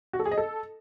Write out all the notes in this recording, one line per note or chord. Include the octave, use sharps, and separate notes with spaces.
F#4
A4
G#4
D#5
A4